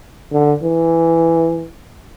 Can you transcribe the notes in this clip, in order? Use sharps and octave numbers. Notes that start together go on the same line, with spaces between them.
D3
E3